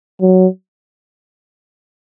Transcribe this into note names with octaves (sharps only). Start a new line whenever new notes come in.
F#3